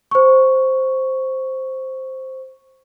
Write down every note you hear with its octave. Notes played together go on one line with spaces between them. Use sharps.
C5 C#6